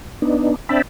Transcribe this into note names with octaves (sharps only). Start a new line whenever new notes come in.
B3 D4 D#4
C4 D4 E5 G5 A5 B5